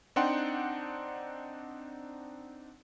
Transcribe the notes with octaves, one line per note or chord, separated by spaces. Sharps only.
C4 D4 D#4 F#5 G5 C6